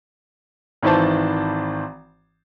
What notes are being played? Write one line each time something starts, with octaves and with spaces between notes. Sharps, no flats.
G#1 D#3 E3 C5 A5